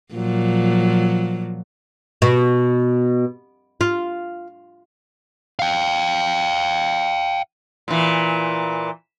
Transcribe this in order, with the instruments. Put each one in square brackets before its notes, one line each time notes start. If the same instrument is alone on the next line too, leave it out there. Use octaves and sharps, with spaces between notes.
[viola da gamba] A#2 F3 F#3
[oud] B2
F4
[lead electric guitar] F5 G5
[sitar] A#2 E3